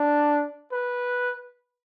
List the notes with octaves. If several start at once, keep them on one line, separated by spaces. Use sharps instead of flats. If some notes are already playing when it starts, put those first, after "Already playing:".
Already playing: D4
B4